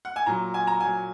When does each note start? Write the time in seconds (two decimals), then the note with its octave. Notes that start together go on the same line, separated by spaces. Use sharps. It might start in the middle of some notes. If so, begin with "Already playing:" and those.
0.05 F#5
0.16 G#5
0.26 A#2 F#3 A#5
0.54 G#5
0.67 A#5
0.80 A#2 F#3 G#5